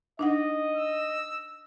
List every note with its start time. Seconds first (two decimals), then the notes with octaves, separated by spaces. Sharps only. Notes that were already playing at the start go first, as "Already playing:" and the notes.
0.19 D4 D#4 D#5 F#5
0.76 E6